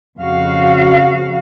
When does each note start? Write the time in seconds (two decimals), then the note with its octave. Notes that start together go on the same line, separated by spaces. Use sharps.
0.19 F2 C#3 F#4 F5